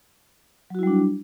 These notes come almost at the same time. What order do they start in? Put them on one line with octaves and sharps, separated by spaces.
F#3 F#4 E4 G3 D4